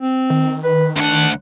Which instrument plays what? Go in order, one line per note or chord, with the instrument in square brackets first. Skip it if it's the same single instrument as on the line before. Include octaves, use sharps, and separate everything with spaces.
[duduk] C4
[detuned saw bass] D#3
[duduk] B4
[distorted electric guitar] D2 F#5 [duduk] D4